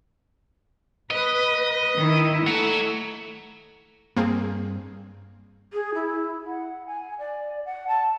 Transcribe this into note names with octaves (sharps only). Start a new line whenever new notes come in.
B4 D#5
D#3 E4
A3 F#5 A#5
G2 A#3 C4 G#4
G#4
E4
F#5
G#5
D5
F#5
A5